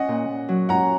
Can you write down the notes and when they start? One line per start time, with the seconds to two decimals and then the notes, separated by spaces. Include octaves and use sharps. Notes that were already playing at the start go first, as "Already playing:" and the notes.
Already playing: C#4 D#5 F#5
0.08 A#2
0.28 A#2
0.49 F#3
0.69 C#4 F#5 A#5